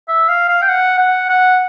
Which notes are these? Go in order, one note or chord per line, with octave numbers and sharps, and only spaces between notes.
E5
F5
F5
G5
F#5
F#5
F#5